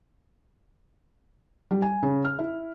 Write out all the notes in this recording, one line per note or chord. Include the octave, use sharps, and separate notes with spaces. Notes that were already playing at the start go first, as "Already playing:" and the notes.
G3
G#5
C#3
F6
E4